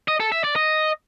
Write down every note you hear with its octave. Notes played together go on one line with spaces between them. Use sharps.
D#5
A4
E5
D5
D#5